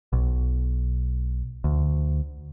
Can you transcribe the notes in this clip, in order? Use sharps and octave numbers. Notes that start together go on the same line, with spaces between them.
B1
D2